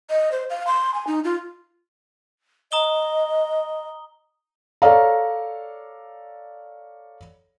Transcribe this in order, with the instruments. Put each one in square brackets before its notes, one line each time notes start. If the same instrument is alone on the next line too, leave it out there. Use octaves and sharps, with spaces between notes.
[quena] D#5
C5
F5
C6
G#5
D#4
F4
[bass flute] D#5 [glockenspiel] A#5 D#6 G7
[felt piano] A4 C#5 D5 F5 A#5